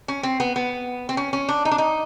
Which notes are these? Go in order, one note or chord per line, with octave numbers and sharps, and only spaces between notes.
C#4
C4
B3
B3
C4
C#4
C#4
D4
D#4
D4
D#4